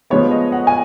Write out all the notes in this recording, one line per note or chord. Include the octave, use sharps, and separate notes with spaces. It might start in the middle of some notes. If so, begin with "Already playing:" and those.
F3 G#3 B3 C#5
D#5
F#5
G#5